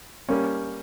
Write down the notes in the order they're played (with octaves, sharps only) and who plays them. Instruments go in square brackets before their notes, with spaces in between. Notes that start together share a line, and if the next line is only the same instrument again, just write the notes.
[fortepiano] G3 A#3 C#4